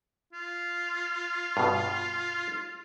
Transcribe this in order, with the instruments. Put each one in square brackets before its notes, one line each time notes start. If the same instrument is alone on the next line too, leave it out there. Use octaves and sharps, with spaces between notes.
[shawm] F4
[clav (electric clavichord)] G2 B2